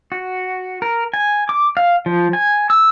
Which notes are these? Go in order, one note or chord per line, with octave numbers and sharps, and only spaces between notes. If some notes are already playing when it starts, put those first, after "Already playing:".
F#4
A#4
G#5
D6
F5
F3
G#5
E6